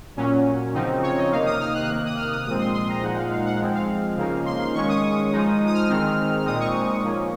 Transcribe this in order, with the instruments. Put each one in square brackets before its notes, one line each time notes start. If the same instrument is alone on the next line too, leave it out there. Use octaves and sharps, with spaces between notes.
[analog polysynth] A#2 F#3 C#4
C#3 F3 C4 D#4
C#5
D#5
C3 D#3 A#3 D#4 F5
D#6
F6
F#6
C3 D#3 A#3
D#6
F6
D#6
A#2 F3 G#3 C4 D#6
C6
C6
A#5
A#2 F3 G#3 D#4 F#5
F5
F5
F#5
F3 G#3 C4
F5
C#3 F3 A#3 D#4
C6
C6
D#3 G#3 C#4 C#6
D#6
F3 G#3 D#4
D#6
F6
D#3 G#3 C4 D#4
A#2 G#3 C4 D#4 D#6
C#6
F3 A#3 C#4